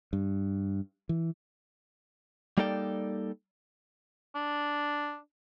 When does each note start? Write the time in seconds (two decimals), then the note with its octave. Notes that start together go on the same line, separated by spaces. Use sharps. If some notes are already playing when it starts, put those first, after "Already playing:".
0.13 G2
1.09 E3
2.58 G3 A#3 D#4 A4 D5 G5
4.35 D4